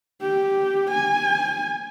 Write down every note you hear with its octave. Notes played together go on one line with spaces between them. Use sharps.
G4
G#5